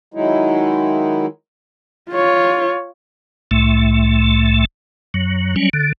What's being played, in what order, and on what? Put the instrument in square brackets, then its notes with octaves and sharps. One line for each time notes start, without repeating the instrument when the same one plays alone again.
[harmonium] D#3 F#3 G#3 D#4 E4
[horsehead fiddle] F4 C#5
[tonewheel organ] C2 A2 A3
F#2 F#3
F#3 G3 C#4
D3